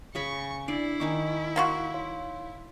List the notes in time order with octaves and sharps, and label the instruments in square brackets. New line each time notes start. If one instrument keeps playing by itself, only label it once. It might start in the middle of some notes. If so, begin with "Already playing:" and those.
[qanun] C#3 G#4 B5 [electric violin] C#6
[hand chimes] D4 C7 [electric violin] E4 [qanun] D5
[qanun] D#3 D#4 D6 [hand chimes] G#5 C#6
[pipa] A#3 F4 F#4 [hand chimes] C#6
[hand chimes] C#5 F5 C6